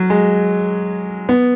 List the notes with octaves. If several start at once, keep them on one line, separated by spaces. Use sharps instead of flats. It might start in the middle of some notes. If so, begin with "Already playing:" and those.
Already playing: F#3
G#3
B3